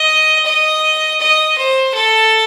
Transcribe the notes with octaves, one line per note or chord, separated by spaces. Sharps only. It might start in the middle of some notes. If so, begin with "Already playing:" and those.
Already playing: D#5
D#5
D#5
C5
A4